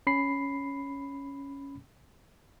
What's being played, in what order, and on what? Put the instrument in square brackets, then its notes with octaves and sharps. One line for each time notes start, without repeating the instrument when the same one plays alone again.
[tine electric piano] C#4 B5 C7